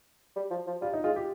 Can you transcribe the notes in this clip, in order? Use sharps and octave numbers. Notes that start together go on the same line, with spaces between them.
G3
F3
F3
G3 F4
D#4
G#3 F4
G4